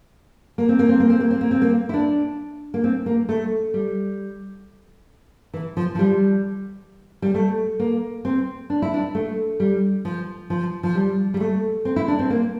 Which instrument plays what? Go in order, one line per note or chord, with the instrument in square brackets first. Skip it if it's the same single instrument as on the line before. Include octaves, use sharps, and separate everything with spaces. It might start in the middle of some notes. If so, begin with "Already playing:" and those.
[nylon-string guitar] A#3
C4
A#3
C4
A#3
C4
A#3
C4
A#3
C4
A#3
E4
D4
A#3
C4
A#3
A3
G3
E3
F3
F3
G3
G3
A3
A#3
C4
D4
E4
D4
A3
G3
F3
F3
F3
G3
G3
A3
C4
E4
D4
C4
A#3